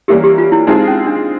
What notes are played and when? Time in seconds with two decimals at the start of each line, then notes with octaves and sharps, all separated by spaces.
0.08 E3 G3 A#3 C#4 E4 G4
0.24 G4
0.38 F4
0.52 E4
0.67 G#3 C4 D#4 F4 G#4
0.87 C#4
1.07 D4